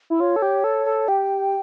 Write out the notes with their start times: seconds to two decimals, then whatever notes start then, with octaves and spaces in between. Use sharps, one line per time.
0.10 E4
0.20 F4 C#5
0.36 A4
0.42 G4
0.64 A4
0.86 A4
1.08 G4 G5